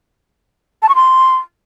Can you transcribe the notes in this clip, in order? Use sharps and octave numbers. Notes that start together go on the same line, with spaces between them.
A5
C#6
C6